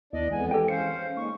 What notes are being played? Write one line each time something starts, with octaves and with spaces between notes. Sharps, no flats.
D#2 B3 D4 E4 D5 D#5
F2 E3 G#3 B3 G#5
G4 A4 G5
C#4 C5 F5 C#7
G#3 A#3 D#4 C#6